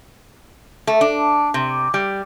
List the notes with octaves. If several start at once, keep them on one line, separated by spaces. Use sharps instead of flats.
A3
D4
C3
G3